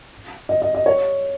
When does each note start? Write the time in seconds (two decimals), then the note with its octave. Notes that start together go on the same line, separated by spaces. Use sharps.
0.49 D#5
0.62 D#5
0.75 D#5
0.86 C#5